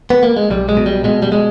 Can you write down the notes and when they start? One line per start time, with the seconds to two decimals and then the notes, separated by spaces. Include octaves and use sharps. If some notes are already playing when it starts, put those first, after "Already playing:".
0.10 B3
0.23 A#3
0.37 G#3
0.50 B1 G3
0.69 G#3
0.77 B2
0.86 G3
1.04 B2 G#3
1.22 G3
1.32 G#3